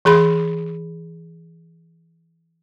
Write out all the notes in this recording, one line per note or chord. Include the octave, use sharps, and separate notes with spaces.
E3 G#4 B5 C6